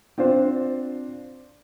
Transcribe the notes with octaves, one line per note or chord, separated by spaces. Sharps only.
C4 D4 F4 C5